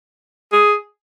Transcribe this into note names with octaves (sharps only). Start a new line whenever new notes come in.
G#4